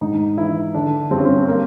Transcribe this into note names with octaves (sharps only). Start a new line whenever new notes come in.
G#2 D#4
E3 E4
D3 D4
G2 C4
C#4
C4
A#3